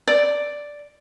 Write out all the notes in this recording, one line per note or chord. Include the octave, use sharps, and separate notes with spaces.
D5